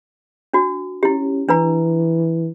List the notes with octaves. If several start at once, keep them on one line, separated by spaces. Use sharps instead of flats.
D4 F#4
C#4 E4 G4
E3 D4 B4 A#5